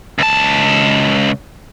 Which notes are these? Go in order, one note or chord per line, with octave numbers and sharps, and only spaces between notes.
C#2 A5